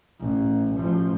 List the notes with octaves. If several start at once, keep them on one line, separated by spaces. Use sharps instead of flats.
A1
A1 F3